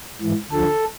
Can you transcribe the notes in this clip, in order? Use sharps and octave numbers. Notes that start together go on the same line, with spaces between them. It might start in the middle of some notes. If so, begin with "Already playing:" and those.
G#2 E3
D2 D3 F3 A4